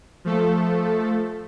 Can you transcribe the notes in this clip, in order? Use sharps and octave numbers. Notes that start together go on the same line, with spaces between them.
F3 A3 A4